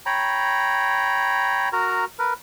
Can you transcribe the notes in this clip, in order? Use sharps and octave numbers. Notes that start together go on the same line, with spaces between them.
C#5 G5 A#5 B5
F#4 A#4 A#5
A#4 B4